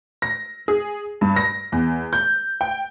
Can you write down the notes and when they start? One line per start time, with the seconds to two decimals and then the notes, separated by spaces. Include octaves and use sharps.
0.22 A#6
0.68 G#4
1.21 G2
1.36 A#6
1.72 E2
2.13 G6
2.61 G5